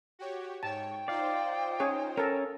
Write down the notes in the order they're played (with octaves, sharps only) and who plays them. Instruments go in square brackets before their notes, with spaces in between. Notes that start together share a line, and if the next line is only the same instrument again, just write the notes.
[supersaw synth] F#4 G4 C#5
[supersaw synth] G#2 C#5 [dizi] G5 [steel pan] A5
[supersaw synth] D#4 F4 C5 [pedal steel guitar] D5 F5
[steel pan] C#4 G#4 C#5
[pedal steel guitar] C#4 [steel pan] A4 A#4